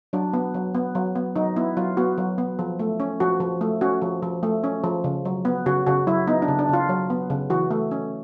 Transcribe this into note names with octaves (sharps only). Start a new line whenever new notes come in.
F#3 D4
B3
F#3
B3
F#3
B3
F#3 D#4
B3 E4
F#3 F4
B3 F#4
F#3
B3
F3
A3
C#4
F3 F#4
F3
A3
C#4 F#4
F3
F3
A3
C#4
F3
C#3
F#3
B3
C#3 F#4
C#3 F#4
F#3 E4
B3 D#4
D4
C#3
D4
C#3 F4
F#3
B3
C#3
E3 F#4
A3
C#4